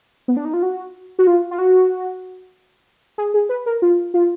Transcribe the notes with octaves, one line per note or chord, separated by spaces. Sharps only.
B3
D4
D#4
F4
F#4
F#4
F4
F4
F#4
G#4
G#4
B4
A#4
F4
F4